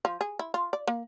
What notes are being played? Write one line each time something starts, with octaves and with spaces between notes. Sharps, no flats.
F3
G#4
E4
F4
D5
A#3